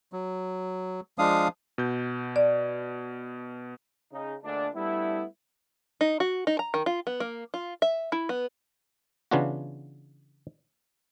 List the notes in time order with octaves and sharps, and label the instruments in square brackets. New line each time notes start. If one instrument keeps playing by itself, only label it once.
[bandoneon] F#3
F3 G#3 D4 F5 D#6
[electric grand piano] B2 G6
[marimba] D5
[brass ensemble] C#3 D#4
D2 A#2 D3 G#3 D4
G3 A3 B3 D4 E4
[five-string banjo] D#4
F#4
D#4
A#5
D#3
F4
B3
A#3
F4
E5
E4
B3
[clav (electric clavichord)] C#3 E3 B3 D4 F4 F#4